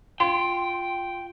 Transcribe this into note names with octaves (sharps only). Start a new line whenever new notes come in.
F4 G5 C6